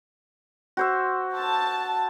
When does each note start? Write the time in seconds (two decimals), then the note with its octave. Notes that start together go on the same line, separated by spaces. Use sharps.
0.77 F#4 C5 E5
1.36 A5